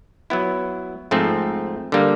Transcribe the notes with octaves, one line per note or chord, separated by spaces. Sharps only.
F#3 B3 E4
G#2 F3 A3 C4
D3 G3 A#3